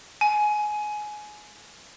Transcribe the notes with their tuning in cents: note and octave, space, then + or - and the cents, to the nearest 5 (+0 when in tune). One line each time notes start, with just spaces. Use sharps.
G#5 +20